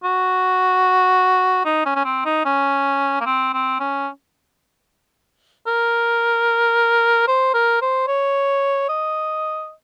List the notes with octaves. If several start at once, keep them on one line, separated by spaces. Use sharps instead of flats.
F#4
D#4
C#4
C#4
C4
D#4
C#4
A#3
C4
C4
C#4
A#4
C5
A#4
C5
C#5
D#5